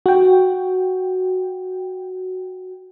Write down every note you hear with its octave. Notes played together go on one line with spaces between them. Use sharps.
F#4 G5